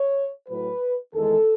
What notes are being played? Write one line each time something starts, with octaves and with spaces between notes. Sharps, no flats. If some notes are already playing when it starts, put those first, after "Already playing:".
Already playing: C#5
A2 F#3 B4
E2 D#3 G#3 A4